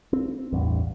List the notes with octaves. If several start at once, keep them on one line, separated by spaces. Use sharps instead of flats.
C4
A1 E2 G2